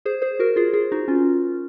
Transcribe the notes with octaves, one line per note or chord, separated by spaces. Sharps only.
G#4 C5
G#4 C5
F#4 A#4
F4 G#4
F4 G#4
D#4 F#4
C#4 F4